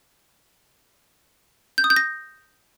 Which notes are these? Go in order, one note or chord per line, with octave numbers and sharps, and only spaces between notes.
G6
D#6
G6
A#6